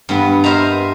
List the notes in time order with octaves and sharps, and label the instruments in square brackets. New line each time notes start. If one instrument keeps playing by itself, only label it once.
[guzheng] G2 B3
A#4 C5 D#5 E5 A#5